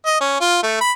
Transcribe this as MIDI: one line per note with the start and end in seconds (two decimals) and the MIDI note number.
0.06 0.19 75
0.20 0.38 61
0.41 0.59 65
0.63 0.81 57
0.81 0.92 83